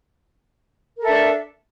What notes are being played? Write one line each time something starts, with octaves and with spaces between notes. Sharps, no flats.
D4 A4 A#4 E5